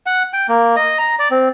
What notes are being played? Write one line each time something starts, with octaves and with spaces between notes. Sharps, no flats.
F#5
G5
A#3
D#5
A#5
D5
C4